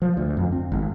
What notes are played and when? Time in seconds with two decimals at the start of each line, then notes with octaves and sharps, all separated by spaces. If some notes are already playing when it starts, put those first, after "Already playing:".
0.02 F3
0.17 D2
0.37 F2
0.52 C4
0.72 G#1